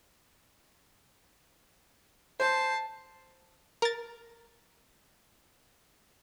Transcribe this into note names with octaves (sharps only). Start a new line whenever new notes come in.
C5 A5 C7
A#4 A6